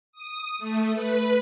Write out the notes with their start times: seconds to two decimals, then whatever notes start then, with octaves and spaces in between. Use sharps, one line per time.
0.12 D#6
0.59 A3
0.95 B4